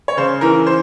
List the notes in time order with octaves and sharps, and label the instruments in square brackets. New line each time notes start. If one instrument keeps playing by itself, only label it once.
[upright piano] C#5
C#3 C5
E3 A#4
C5